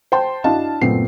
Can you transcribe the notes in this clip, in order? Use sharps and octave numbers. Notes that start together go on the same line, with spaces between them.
C5 G5 A5 C6
D4 E4 F#4 D#5 F5 A5
F#1 A#2 A3 B3 C4 C7